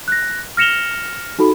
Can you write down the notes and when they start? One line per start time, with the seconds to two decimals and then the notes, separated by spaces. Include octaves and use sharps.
0.08 F#6 A#6
0.57 F6 A#6 C#7 E7 F7 G7
1.39 D#4 F#4 A4 B5